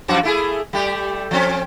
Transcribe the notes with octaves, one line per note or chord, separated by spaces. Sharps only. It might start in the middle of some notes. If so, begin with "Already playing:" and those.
F#2 F3 F#4
A3 E4 G#4
G3 A3 G4
F3 C4 C#4